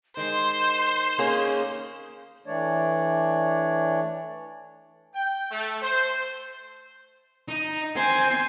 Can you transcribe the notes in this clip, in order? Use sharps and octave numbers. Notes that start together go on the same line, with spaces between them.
D#3 G#3 C5 G#5 C6
A#3 C#4 G#4
E3 A3 D4 C#5 D5
G5
A3
C5
D#4
C4 C5 G#5